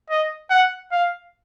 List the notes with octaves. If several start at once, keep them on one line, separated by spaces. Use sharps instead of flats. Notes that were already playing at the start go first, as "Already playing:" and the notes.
D#5
F#5
F5